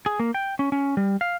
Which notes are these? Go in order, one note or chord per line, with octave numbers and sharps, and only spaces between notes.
G#4
A#3
G5
C#4
C#4
G3
F5